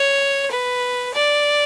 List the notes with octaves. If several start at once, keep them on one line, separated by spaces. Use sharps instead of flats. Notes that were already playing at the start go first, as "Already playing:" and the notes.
Already playing: C#5
B4
D5